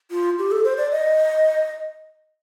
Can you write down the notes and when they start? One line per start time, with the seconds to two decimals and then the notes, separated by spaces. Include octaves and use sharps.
0.11 F4
0.39 G4
0.51 A4
0.64 C5
0.78 D5
0.91 D#5